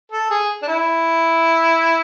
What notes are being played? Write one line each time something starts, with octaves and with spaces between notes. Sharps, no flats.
A4
G#4
D4
E4